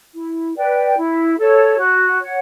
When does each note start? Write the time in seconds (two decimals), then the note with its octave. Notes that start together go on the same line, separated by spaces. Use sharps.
0.15 E4
0.56 B4 D5 G5
0.97 E4
1.38 A4 C#5
1.78 F#4
2.19 C#5 F#5